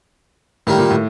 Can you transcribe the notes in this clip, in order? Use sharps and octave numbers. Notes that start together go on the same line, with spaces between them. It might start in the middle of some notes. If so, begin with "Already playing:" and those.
A2 D#3 G3 A#3
A#2
A2